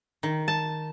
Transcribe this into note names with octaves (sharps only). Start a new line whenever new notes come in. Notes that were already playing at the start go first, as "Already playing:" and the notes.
D#3
A5